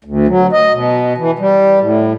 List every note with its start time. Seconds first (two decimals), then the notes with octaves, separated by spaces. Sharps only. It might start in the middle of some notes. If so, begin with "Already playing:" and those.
0.05 D2
0.27 F#3
0.52 D#5
0.72 B2
1.18 E3
1.39 G3
1.80 A2